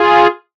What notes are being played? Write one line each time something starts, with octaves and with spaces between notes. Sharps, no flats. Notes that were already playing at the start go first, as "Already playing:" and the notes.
Already playing: F4 G#4